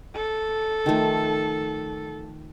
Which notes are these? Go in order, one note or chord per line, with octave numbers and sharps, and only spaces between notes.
A4
D#3 F3 A3